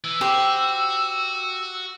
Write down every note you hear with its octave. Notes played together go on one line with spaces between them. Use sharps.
E3 E6
F#4 G4 C5